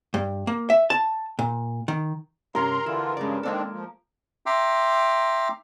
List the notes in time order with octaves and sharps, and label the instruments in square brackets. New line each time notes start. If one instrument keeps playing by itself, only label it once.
[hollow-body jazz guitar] G2
A#3
E5
A5
A#2
D#3
[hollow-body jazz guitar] G2 C3 C#4 [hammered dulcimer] A#4 [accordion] A#5 C6
[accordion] D3 E3 F4 [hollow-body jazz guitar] E4
[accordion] G2 C#3 [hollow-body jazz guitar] G#3 D5
[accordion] D#3 C4 D4 [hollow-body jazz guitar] G#3 A#3 A4
[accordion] F3
[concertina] E5 G5 A#5 C6 D6